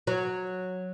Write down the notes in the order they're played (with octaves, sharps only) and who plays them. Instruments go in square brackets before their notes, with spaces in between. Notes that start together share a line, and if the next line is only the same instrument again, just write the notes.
[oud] F#3